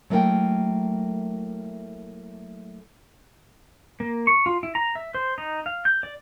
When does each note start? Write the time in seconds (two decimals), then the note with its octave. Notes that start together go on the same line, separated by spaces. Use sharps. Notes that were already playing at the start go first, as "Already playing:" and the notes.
0.10 F#3 A3 A#3 E4 A#4 G5
4.00 A#3
4.27 C#6
4.46 F4
4.63 E4
4.75 A#5
4.95 E5
5.15 C5
5.38 D#4
5.66 F5
5.85 G6
6.03 D5